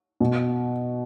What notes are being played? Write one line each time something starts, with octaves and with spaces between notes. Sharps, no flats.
B2